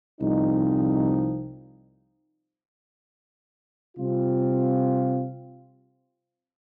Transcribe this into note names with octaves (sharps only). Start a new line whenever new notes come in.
C2 C3 F3 C4 D#4
C3 G3 C4 F4